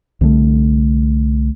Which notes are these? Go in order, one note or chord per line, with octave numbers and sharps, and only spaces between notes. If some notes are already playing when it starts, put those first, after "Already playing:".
C2 D3 G#3 A3